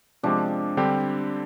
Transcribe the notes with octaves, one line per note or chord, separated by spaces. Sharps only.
C3 F3 G#3 C4 D4
D3 G3 C4 G4